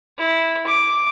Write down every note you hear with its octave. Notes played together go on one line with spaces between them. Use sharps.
E4
D6